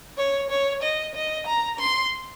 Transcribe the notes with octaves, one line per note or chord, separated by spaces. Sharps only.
C#5
C#5
D#5
D#5
A#5
C6